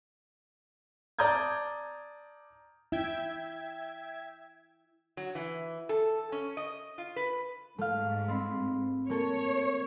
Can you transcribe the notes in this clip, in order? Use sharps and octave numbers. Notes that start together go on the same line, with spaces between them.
D5 A5 A#5 D#6 G6 G#6
E4 E5 G5 G#6
F#3
E3
A4
C#4
D#5
F4
B4
G#2 A3 F5
C4 B5
A#3 A4 C#5